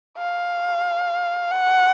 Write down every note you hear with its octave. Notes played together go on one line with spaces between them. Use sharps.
F5
F#5